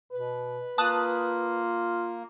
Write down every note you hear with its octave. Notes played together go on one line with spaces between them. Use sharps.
B2 B4
A#3 F4 A5 D#6 F#6